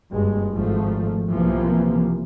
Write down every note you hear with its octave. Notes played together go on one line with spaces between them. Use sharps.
F#1 G2 G#3
G#1 G#2 F3 A3
B1 C3 E3 F3 A#3